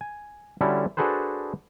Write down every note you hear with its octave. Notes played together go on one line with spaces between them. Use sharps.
G#5
D3 G3 C#4 E4 F#4 A4
D4 F#4 G#4 A4 B4 C5